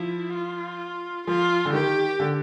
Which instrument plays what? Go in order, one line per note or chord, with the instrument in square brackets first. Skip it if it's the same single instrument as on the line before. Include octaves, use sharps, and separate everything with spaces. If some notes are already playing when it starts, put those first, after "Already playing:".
Already playing: [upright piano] F3 [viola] E4
[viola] F4
[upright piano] F3 [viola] F4
[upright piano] D3
[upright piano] D#3 [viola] G4
[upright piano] D3